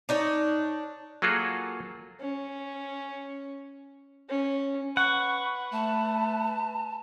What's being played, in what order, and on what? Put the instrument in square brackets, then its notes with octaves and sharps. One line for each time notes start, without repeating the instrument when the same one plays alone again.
[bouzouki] D4 D#4 C#5
[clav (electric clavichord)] F#3 A#3 F4 F#4 G#4 A4
[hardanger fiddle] C#4
C#4
[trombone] B4 [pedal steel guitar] F#5 [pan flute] C#6
[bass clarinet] A3 [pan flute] A5